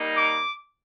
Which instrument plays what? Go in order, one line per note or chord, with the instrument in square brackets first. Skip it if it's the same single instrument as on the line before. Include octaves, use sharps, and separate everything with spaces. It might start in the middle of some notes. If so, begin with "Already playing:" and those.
Already playing: [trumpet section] G3 A#3 D#4
D6